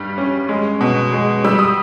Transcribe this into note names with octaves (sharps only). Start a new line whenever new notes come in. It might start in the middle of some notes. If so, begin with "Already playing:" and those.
Already playing: G2 G3
C#4
G#3
B2
G#3
G3 E6
D#6